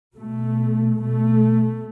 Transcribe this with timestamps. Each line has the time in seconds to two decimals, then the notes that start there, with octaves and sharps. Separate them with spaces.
0.16 B2 A3
0.98 B2 A3